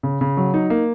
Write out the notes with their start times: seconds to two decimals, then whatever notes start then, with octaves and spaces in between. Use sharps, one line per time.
0.03 C#3
0.21 C#3
0.37 F#3
0.54 D#4
0.70 A#3